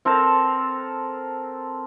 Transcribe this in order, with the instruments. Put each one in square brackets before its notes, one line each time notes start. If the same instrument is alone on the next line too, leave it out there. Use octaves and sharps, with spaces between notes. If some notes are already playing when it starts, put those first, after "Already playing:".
[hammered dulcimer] C4 A4 A#4 A5